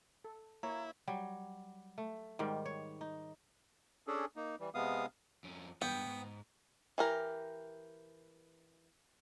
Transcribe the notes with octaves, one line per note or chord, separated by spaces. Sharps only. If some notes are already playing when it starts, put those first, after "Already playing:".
A4
A#3 E4 C#5 A#5
F#3 G3
A3
G#2 D#3 G3
C#5
D#4
C#4 D4 G#4 A4
A#3 D#4
E3 G3
C3 G#3 B3 F5 D#6
F2 C#4
G2 G#3 B3 G5
G#2
E3 G4 A#4